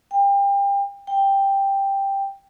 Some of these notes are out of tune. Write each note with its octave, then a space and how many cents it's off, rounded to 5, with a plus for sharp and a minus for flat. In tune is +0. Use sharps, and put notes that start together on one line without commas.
G5 +30
G5 +5